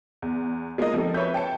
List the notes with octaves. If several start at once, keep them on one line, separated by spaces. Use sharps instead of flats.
E2
G#3 A#3 D#4 F4 D#5
F3 C4 D#4 A4
B4 C#5 E5 G6
G5 A5 C#7